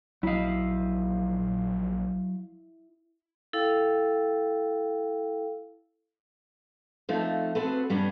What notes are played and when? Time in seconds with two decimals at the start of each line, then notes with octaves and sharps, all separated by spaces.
0.23 A#1 F#3 E4 D#5 F5
3.53 E4 A4 F5 G5
7.09 F2 F3 A3 D#4
7.55 C4 F#4 G#4 A4 B4
7.90 G2 G3 B3 C#4 D4